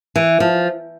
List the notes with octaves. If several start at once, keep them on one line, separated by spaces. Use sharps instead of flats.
E3
F3